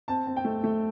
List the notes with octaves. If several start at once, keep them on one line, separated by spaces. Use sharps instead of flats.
C4 A5
C4
G5
A3
A3